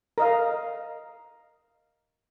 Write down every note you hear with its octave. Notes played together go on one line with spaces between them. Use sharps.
A#4 D#5 F5